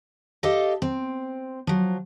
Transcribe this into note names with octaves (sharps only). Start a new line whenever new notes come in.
G4 A4 D#5 F5
C4
F3 F#3